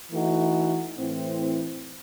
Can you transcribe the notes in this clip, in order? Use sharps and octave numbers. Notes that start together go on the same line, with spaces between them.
E3 A3 D#4 F#4
A2 E3 C4